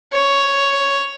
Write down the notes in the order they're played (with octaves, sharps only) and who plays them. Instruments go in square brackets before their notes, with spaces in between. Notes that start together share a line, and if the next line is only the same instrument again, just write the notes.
[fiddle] C#5